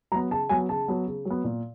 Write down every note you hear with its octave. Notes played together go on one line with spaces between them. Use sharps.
F#3 B3 A#5
C#3 A5
F#3 B3 G#5
C#3 A5
F#3 B3
C#3
F#3
B3
A#2